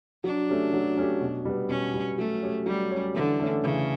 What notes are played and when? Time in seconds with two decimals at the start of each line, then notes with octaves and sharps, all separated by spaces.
0.24 F#3 D4
0.49 A3 C#4 G4
0.73 F#3
0.97 A3 C#4 G4
1.21 B2
1.45 G3 B3
1.69 B2 C#4
1.94 G3 B3
2.18 F#3 A3
2.43 C#4 G4 C#5
2.66 F#3 G3
2.91 C#4 G4 C#5
3.14 D3 E3
3.40 A3 C#4
3.63 C#3 E3